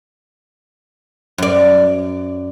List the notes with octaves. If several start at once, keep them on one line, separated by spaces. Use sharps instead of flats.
F#2 D5